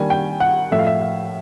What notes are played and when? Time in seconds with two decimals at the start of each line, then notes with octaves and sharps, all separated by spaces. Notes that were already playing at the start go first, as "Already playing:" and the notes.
Already playing: D#3 G3 A#3 D4 G#5
0.10 G5
0.40 F#5
0.71 A2 F3 A3 E5
0.79 F5
0.87 E5
1.01 F5